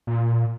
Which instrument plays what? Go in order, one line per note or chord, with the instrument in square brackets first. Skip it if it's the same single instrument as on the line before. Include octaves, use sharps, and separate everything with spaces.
[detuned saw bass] A#2